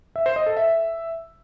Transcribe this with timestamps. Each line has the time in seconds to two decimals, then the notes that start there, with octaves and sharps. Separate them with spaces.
0.16 E5
0.26 C5
0.36 D#5
0.46 A4
0.57 E5